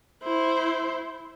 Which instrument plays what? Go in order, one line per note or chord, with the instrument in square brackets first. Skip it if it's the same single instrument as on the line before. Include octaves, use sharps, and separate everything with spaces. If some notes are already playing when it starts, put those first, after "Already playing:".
[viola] E4 C5